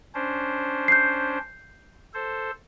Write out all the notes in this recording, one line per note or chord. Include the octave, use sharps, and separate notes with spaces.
C#4 D4 C5
G6 C7
A4 C5